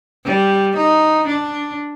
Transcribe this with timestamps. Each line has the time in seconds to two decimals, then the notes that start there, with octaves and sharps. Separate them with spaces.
0.25 G3
0.77 D#4
1.28 D4